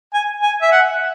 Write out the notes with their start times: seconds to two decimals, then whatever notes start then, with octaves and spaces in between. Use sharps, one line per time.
0.14 G#5
0.42 G#5
0.62 E5
0.72 F#5